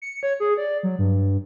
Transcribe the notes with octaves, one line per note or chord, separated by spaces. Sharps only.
C#7
C#5
G#4
D5
F#3
G2